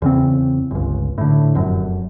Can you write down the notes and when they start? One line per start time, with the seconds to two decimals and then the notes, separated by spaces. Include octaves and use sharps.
0.02 E2 C#3 C4
0.71 G1 C#2
1.18 A2 D3
1.55 F1 F#2